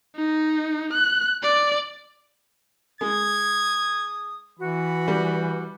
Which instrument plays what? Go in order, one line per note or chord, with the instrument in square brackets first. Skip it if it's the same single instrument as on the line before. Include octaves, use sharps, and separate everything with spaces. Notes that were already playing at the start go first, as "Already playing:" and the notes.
[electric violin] D#4
F#6
D5
[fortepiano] G#3 [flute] D#6 [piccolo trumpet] G#6
[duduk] E3 [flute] F#4 [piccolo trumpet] B5
[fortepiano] G3